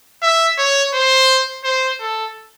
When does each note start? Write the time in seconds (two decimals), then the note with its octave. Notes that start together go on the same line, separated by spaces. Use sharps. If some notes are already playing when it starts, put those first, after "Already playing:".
0.23 E5
0.59 C#5
0.94 C5
1.64 C5
2.01 A4